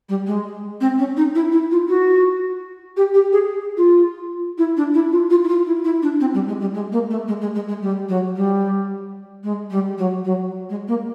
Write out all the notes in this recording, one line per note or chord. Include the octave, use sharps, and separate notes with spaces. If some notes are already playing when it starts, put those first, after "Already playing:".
G3
G#3
C4
C#4
D#4
E4
E4
F4
F#4
G4
G4
G#4
F4
E4
D4
E4
F4
F4
E4
F4
E4
E4
D4
C4
G3
G#3
G3
G#3
A#3
A3
G#3
G#3
G#3
G#3
G3
F#3
G3
G#3
G3
F#3
F#3
G#3
A#3